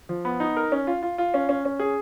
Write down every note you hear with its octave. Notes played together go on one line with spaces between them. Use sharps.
F3
B3
D#4
A#4
C#4
F4
F4
F4
C#4
C#4
C#4
G#4